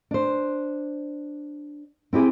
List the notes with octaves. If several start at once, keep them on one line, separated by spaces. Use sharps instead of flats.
D4 C5
C4 E4 G4 G#4